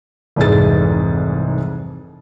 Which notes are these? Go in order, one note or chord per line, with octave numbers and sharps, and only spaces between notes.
F1 C2 G#2 E3 G#4 A6